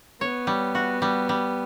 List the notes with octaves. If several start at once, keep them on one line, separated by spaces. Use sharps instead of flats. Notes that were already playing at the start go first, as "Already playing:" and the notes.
B3 C#5
G3
F#4
G3
G3